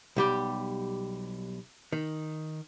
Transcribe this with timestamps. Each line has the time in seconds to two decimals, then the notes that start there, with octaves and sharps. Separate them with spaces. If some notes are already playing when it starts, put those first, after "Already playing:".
0.16 B1 G3 G4
1.92 D#3